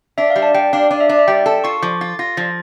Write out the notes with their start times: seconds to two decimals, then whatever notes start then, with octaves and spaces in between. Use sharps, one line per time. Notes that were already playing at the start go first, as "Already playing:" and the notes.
0.18 D4 E5
0.30 F5
0.36 G3
0.42 A5
0.54 G3 G5
0.73 D4 F5
0.91 D4 D5
1.00 E5
1.09 D4 D5
1.19 E5
1.28 G3 G5
1.46 A4 A5
1.64 F4 C#6
1.82 F3 D6
2.01 F4 A6
2.19 F4 A#6
2.37 F3 A6